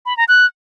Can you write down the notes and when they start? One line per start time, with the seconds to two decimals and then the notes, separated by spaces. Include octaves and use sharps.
0.06 B5
0.17 A#5
0.28 F#6